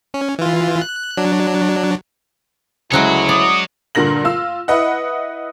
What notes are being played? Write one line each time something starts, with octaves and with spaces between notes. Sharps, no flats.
C#4
E3 F4
F#6
F#3 D4
D2 C#3 F#3 G#3 E4 C#5 F#5
D5 D#6
G2 A#2 D3 A#4 A#6 F#7
F4 F5 E6
E4 B4 D#5 F#5